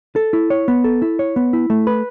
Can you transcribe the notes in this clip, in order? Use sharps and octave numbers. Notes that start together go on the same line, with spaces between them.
A4
E4
C#5
B3
A4
E4
C#5
B3
E4
A3
B4